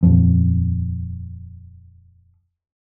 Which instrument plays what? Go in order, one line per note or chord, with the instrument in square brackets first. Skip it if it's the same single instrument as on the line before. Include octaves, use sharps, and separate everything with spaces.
[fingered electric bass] D#1 F2